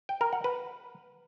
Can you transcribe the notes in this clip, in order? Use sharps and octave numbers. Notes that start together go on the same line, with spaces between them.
G5
A#4
F#5
B4